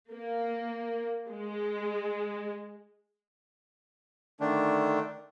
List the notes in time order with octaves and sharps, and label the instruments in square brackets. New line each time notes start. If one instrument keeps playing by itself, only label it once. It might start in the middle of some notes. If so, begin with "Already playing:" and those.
[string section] A#3
G#3
[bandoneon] D3 D#3 A3 D4